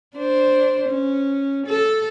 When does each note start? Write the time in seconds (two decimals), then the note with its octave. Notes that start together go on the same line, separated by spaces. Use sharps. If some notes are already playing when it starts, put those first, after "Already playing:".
0.16 D4 C5
0.88 C#4
1.67 A4